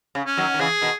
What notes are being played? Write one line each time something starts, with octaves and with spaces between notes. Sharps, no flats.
C#3
C#4
D#3 F#3
D#3
C#3 E3 G#4
B2 D#3